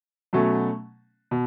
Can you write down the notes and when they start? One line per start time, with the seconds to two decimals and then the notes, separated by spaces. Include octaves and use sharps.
0.33 B2 F#3 A3 C#4
1.31 B2